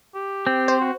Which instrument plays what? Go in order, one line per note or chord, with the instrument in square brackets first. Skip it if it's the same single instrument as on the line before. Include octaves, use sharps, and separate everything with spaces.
[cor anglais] G4
[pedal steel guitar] C4
[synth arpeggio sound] C5
[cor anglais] F#4